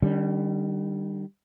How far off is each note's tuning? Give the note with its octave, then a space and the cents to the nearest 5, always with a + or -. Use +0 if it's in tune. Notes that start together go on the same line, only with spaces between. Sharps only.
D#3 -45 G3 +0 C#4 +30